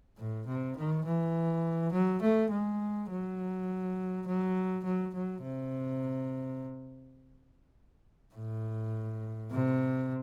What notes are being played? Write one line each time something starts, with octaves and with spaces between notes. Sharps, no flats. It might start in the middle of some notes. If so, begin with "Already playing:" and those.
A2
C3
D#3
E3
F#3
A3
G#3
F#3
F#3
F#3
F#3
C3
A2
C3